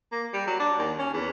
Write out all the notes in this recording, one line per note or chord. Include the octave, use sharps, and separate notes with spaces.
A#3
G3
F#3
D4
D#2
C#4
E2